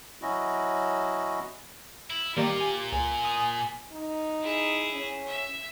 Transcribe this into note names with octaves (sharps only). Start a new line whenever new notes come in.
F#3 C#4 E4 F#4 D#5
E4
A#2 D#3 G3 A#3 F4 G4
G#5
C#2 G#5
D#6
D#4
E4 G#4
C#4
E5